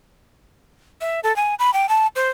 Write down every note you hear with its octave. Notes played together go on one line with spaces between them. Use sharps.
E5
A4
G#5
B5
G5
A5
C5